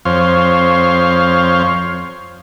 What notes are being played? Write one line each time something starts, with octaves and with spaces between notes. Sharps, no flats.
F2 C5 C#5 F5